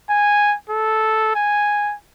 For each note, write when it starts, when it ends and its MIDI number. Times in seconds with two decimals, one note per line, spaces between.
0.10 0.56 80
0.69 1.32 69
1.35 1.95 80